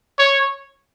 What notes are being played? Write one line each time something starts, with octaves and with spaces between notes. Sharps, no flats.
C#5